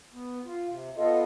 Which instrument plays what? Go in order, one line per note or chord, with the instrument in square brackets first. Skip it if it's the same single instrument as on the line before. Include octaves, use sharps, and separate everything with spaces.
[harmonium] B3
F4
C3
[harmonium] B3 F4 A4 [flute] D#5